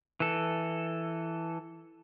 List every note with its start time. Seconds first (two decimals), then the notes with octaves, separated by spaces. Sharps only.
0.20 E3 A4